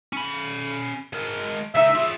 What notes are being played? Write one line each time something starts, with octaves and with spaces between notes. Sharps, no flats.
C#4 B5
G#3 A#4
C#2 D#4 E5
F4 G#4